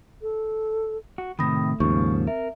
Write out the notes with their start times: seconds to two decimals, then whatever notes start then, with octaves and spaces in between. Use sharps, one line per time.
0.22 A4
1.18 F#4
1.39 A2 C3 D#3 A3 B5 D#6 A#6
1.80 D#2 G#2 C#3 F3 C#6
2.27 C4 A#4 E5